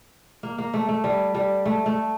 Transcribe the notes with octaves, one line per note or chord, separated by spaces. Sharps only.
A#3
A#3
A3
A3
G3
G3
A3
A3